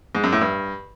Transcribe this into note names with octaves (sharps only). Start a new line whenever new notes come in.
G#2
F#2
A2
G2